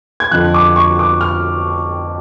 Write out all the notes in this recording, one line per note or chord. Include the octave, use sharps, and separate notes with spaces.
G#6
F2 D3 F3 F#6
D6
C#6
D6
F6